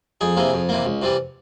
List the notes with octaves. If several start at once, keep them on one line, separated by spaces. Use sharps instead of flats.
F2 G#4
C3 E3 A#3
F2
C3 E3 A#3
C#2
C3 E3 G3